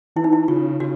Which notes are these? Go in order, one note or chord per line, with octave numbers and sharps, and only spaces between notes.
E3 E4
D#4
E4
C#3 F4
C#3 F#4